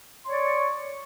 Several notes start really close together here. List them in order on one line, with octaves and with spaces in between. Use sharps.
C6 C#5 D5 C#6